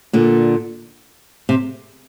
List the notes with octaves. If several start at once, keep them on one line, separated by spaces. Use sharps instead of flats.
A#2 D3
C3